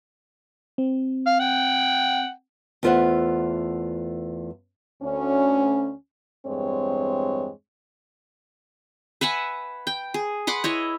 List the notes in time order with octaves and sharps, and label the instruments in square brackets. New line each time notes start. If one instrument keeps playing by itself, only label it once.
[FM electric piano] C4
[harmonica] F5
F#5 G5
[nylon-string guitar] E2 A3 F4 C5 E5 F#5
[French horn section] D2 C#4
E2 G2 G#3 C4 C#5
[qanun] B4 E5 F#5 G#5
G5
G#4
B4 F#5 C6 D6
E4 C#5 D#5